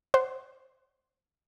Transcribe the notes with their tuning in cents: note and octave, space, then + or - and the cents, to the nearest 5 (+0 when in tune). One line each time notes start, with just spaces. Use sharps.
C5 +0 F#5 +25